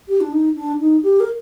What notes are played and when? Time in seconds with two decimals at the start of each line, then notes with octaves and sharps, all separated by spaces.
0.08 G4
0.21 D4
0.32 D#4
0.56 D4
0.80 D#4
1.03 G4
1.20 A#4